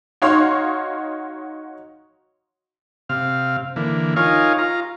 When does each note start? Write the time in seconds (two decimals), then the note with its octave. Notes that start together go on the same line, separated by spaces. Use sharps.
0.22 D#4 F#4 C#5 F5 C6
3.09 C3 F5
3.76 D3 E3 A#3
4.16 D#4 F4 A#4 C#5 F5 G#5
4.58 F4 A#5